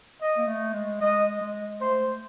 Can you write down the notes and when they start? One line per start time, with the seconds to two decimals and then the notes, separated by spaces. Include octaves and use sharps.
0.21 D#5
0.38 A#3
0.47 A3
0.73 G#3
1.00 G#3 D#5
1.41 G#3
1.81 A3 C5